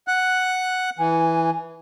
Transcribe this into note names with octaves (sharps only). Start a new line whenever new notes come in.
F#5 F#6
E3 G#5